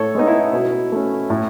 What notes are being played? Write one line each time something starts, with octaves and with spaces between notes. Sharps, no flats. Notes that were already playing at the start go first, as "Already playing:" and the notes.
Already playing: A2 A4 C#5
G#3 B3 D#4
E4
B2
A3 C#4
A2